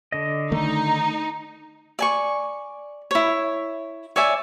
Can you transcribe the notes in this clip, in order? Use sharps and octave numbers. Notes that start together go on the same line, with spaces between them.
D3 D#5
D#3 A3 D#4
D5 G#5 C#6
E4 C#5
C#5 D5 E5 G#5